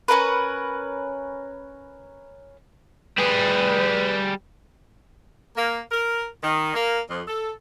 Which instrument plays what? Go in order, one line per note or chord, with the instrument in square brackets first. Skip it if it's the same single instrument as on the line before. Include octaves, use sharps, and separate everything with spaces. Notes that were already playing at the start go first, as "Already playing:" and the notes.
[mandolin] C#4 D4 A#4 B4
[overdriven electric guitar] G3 G#4 [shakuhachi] B4
[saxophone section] A#3
A#4
D#3
A#3
F2
A4